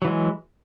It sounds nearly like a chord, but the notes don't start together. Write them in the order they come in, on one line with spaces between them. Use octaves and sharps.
F#3 E3 G#3